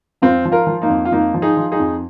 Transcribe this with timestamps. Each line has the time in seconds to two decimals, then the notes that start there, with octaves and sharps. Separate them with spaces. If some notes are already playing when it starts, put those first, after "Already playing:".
0.22 F2 C4 F4
0.45 F3
0.52 F4 A#4
0.67 F3
0.82 A#3 D#4
0.90 F2
1.05 F4
1.12 F2 A#3 D#4
1.34 F3
1.42 D#4 G#4
1.57 F3
1.72 D#4 G#4
1.80 F2